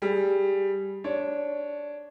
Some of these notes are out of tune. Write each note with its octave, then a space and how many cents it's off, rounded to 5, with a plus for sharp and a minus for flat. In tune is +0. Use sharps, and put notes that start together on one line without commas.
G3 +0 G#4 +0
D4 -10 C#5 +0